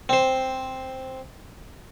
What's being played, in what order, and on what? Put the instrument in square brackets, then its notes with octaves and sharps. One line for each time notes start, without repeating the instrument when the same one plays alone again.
[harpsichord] C4 C5